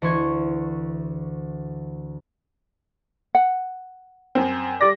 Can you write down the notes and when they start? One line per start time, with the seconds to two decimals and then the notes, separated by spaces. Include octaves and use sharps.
0.02 D2 E3 C6 C#6 G#6
3.35 F#5
4.35 F#2 C4
4.81 G3 D5 A#6